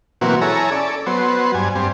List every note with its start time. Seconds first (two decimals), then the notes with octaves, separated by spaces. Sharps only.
0.21 B2 E3 F#3 A#3 C4 F#4
0.41 E4 G#4 A4 C#5 A#5
0.72 C#4 A4 D5
1.06 F#3 B3 C5
1.54 G2 G#5
1.75 G2 C4